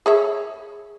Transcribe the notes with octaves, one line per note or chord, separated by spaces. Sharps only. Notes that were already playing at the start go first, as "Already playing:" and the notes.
G#4 C#5 E5